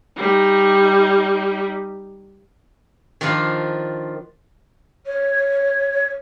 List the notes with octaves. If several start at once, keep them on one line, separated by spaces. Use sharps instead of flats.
G3 D#4
D#3 F3 D4 F4
C#5